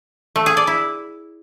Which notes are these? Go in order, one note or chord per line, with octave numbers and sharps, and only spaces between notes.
A3
G#4
D5
E4